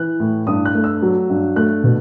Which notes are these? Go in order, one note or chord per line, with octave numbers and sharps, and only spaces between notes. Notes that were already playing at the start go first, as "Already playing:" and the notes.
Already playing: E3 F#6
A2
G2 D#6
F#6
A3
E6
F#3
G2
A3 F#6
B2